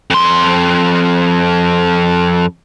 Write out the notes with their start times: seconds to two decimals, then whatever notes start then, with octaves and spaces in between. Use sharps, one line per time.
0.10 F2 C6